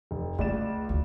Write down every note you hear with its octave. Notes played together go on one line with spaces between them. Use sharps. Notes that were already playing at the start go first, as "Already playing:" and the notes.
F1
C#2 A3 D5 E7
D2